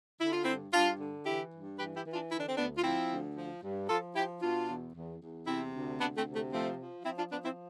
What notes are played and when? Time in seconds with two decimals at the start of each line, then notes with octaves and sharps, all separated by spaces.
0.20 D3 E4
0.32 F4
0.44 G2 C4 E4
0.73 G2 D4 F4
0.99 D3
1.25 E3 E4 G4
1.52 G2
1.78 E3 G4 B4
1.96 E4 G4
2.05 E3
2.13 D4 F4
2.31 D3 E4
2.40 D4
2.49 C4
2.57 D2 B3 D4
2.78 F4
2.84 F3 C4 E4
3.10 D2
3.37 F3
3.63 G2
3.89 F3 F4 A4
4.15 F3 E4 G4
4.42 B2 D4 F4
4.68 E2
4.94 E2
5.21 E2
5.47 C3 C4 E4
5.73 D2
6.00 D2 B3 D4
6.17 A3 C4
6.26 C3
6.36 A3
6.52 F3 A3 C4
6.79 F3
7.05 F3 C4 E4
7.18 D4 F4
7.31 F3 B3 D4
7.45 C4 E4